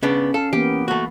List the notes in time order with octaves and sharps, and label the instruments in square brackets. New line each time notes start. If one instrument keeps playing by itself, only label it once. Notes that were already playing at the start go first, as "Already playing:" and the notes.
[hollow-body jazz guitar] C#3 B3 D4 [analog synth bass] C#4
[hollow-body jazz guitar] A4 [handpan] F5
[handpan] E3 A#3 B3 [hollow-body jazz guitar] G4
[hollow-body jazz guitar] A3 F#4